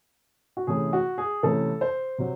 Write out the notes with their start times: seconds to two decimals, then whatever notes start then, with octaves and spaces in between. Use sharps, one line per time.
0.57 F#4
0.67 C3 E3 A3 C#4 G#4
0.93 F#4
1.18 G#4
1.43 C3 E3 A3 C#4 A4
1.81 C5
2.18 C3 F#3